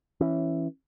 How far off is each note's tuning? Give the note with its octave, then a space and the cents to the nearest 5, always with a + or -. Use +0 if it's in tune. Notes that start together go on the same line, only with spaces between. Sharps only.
E3 +0 C#4 -15